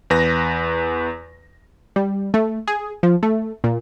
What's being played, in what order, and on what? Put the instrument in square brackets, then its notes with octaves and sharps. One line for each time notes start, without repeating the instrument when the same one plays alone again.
[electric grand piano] E2 B4 A#6
[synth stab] G3
A3
G#4
F3
A3
A#2